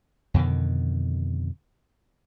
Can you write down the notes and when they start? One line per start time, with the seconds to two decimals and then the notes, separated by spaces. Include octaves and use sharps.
0.34 F2 B2 D3 D#3